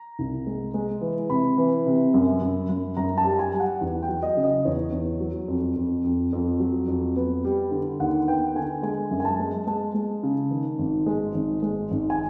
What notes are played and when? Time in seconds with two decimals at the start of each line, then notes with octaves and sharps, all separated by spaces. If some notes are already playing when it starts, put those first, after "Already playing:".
Already playing: A#5
0.19 C2
0.47 G#3
0.74 G#3
1.01 E3
1.30 C3 B5
1.58 E3
1.86 C3
2.14 F#2
2.42 F#2
2.69 F#2
2.97 F#2 A#5
3.18 A5
3.25 G3
3.39 G#5
3.53 G3
3.60 F#5
3.81 E2
4.03 G5
4.09 F#3
4.23 D#5
4.37 C#3
4.44 D#5
4.65 E2 C#5
4.92 E2
5.20 F#3
5.48 F2
5.76 F2
6.04 F2
6.33 F2
6.60 F#3
6.88 F2
7.16 B3
7.44 G3
7.71 D3
8.00 D#2 F#5
8.27 B3 G5
8.55 D3 G#5
8.83 G#3 G#5
9.11 F#2
9.20 G#5
9.25 A5
9.39 G#3
9.67 G#3 A5
9.94 G#3
10.23 C#3
10.51 D#3
10.79 G#1
11.06 G#3
11.34 G#1
11.62 G#3
11.91 G#1
12.10 G#5